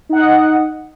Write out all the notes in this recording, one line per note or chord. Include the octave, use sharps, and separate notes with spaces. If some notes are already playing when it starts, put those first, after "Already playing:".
D#4 D#5 F#5